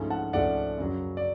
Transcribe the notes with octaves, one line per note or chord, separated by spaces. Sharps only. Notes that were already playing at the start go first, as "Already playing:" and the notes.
Already playing: G#2 F3 A3 C#4
F#5 A5
G#2 F3 A3 C#4 D5 F#5
F#2 C#3 F#3
D5